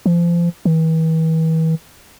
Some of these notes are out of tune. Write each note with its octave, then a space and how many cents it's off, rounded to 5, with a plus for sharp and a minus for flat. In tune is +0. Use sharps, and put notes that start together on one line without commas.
F3 -30
E3 -40